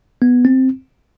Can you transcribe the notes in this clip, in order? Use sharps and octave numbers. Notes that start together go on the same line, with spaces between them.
B3
C4